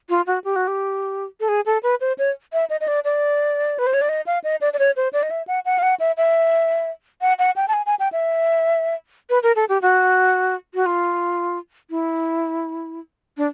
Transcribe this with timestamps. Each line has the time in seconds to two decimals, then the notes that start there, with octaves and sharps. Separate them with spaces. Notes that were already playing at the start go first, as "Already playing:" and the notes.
0.09 F4
0.27 F#4
0.44 G4
0.56 F#4
0.67 G4
1.40 A4
1.48 G#4
1.66 A4
1.83 B4
2.01 C5
2.18 C#5
2.53 E5
2.70 D#5
2.80 D#5
2.88 D5
3.04 D5
3.79 B4
3.86 C5
3.94 C#5
4.01 D5
4.09 D#5
4.26 F5
4.44 D#5
4.61 D5
4.73 D5
4.79 C#5
4.96 C5
5.13 D5
5.23 D#5
5.30 E5
5.47 F#5
5.65 F#5
5.78 F5
5.82 F#5
6.00 E5
6.17 E5
7.21 F#5
7.39 F#5
7.56 G5
7.68 A5
7.73 G#5
7.86 G#5
7.99 G5
8.12 E5
9.30 B4
9.43 A#4
9.56 A4
9.69 G4
9.82 F#4
10.74 F#4
10.86 F4
11.90 E4
13.37 D4